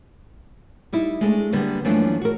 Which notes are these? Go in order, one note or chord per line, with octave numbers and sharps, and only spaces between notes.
G3 D#4 E4
G#3 A3 B3 D4
D3 G3 A#3 B3
F#2 E3 F3 A3 A#3 D4
F#4 A#4